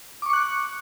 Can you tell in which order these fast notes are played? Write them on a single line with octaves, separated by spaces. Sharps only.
D6 C#6 C#7 F#6